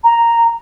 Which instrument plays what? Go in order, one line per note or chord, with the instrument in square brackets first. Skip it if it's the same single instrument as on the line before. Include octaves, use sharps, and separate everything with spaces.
[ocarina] A#5